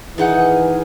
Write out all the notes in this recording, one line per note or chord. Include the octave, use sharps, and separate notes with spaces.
D#3 E3 D#4 G#4 F#5